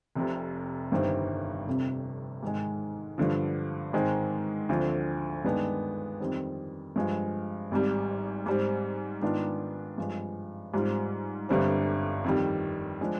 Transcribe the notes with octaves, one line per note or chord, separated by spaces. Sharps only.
F1 F2 C3
G1 G2 D#3 G3 C4
F1 F2 C3
G#2 D#3 G#3
G2 D3 F3
G#2 D#3 G#3 C4
D2 D3 F3 C4
G2 D#3 G#3 B3 D4
F2 D#3 G3 C4
G2 F3 G#3
G#1 G#2 G3
G#2 G3 C4
G#2 D#3 B3 D4 F4
G2 F3 G#3
G#2 G3 C4 F4
G1 G2 D3 G3 C4
F2 D#3 G3
F3 G#3 D4